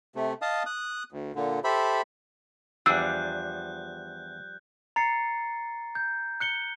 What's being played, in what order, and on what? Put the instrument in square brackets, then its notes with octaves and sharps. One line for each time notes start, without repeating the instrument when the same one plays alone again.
[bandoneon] C3 A3
D#5 F5 A5 D#6
D#6 F#6
D2
A#2 D3
G4 A4 C5 E5 B5
[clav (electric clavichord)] E2 D4 [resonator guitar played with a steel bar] F3 G3 [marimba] E6 [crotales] F#6 G6
[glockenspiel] A#5 A6 C7 C#7
G6
F#6 C#7 G7